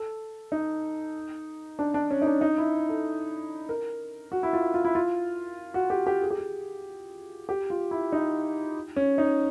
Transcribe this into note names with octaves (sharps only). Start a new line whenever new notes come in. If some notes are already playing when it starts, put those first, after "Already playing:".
Already playing: A4
D#4
D4
D4
C#4
D#4
D4
D#4
E4
A4
A#4
F#4
E4
F4
F4
E4
F4
F#4
G4
G4
G#4
G4
G#4
G4
F4
E4
D#4
C#4
D#4